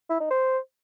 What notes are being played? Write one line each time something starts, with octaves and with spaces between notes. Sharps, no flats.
E4
D#4
C5